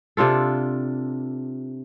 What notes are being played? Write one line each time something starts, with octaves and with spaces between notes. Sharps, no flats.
C3 D4 F4 A4